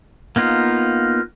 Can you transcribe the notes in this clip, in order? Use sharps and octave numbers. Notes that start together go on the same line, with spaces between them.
A#3 B3 D#4 F4